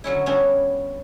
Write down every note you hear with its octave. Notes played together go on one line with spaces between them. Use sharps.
D3 F#3 C#4 E4
G3 B3 C#4 D4 E4 F#4